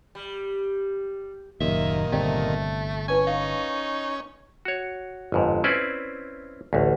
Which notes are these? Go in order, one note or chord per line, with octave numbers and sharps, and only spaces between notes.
G3
F#1 D#2 A#2 D#3 E5
G1 C3 A3 D5 G5
C#4 E4 B4 G#5 A5
D#4 F5
F#4 C#5
G1 F2 G#2
C4 C#4 E4 B4 C5 D5
A1 D2